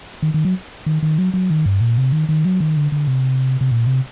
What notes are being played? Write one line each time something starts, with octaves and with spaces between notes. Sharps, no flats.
D#3
D#3
F#3
D#3
D#3
F#3
F#3
D#3
G2
A#2
C3
D#3
D#3
F#3
D#3
D3
D3
C3
C3
A#2
C3